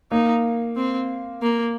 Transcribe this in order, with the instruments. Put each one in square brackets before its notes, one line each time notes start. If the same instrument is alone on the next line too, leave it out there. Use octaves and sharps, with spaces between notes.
[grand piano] A#3 [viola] D#4
[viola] C4
A#3